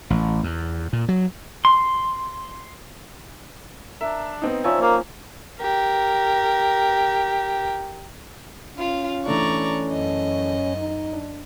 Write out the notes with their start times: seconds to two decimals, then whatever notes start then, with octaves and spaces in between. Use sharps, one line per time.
0.10 A1
0.43 E2
0.93 A#2
1.08 F#3
1.65 C6
4.01 D4 A#4 E5
4.42 B3 C4 D#4
4.64 F3 C#4 D#4 C#5 D5 E5
4.81 A#3 A#4
5.59 G4 A#4
8.77 C#4 F4 F5
9.26 E3 A3 D4 D5 A#5 C#6
9.91 F#2 D#5
10.78 D#4
11.13 D4